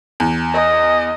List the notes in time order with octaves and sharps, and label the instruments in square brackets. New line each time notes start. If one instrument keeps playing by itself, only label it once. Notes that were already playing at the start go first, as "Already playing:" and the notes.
[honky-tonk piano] E2
[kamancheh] D#5